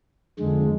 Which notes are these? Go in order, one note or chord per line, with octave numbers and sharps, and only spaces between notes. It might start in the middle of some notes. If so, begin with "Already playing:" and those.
F2 D3 G#3